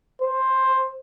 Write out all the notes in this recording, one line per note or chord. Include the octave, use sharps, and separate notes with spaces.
C5